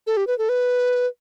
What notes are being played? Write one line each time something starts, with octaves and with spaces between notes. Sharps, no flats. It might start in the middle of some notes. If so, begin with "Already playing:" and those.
A4
G4
B4
A4
B4